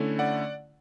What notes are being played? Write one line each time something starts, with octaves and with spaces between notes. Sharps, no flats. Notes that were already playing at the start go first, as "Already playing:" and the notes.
Already playing: D3 A3 C#4 E4
D5 F#5